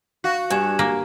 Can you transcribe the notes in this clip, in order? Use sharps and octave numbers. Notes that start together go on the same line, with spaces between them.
F#4 F5
G2 G#5 G#6 E7
A#3